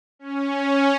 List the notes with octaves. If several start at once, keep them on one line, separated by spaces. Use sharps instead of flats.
C#4